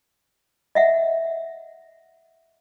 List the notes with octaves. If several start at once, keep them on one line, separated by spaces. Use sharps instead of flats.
D#5 E5 F#5